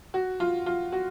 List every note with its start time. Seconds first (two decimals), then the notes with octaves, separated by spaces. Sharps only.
0.14 F#4
0.40 F4
0.66 F4
0.92 F#4